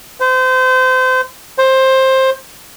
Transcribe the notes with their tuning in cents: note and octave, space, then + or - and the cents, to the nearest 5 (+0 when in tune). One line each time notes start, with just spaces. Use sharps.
C5 -30
C5 +15